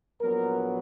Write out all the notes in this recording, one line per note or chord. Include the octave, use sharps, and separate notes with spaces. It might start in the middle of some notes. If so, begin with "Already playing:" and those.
A#1 A#2 F#3 B3 A#4